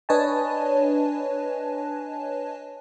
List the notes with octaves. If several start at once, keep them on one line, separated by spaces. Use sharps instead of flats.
D4 B4 C#5 D#5 G#5 A5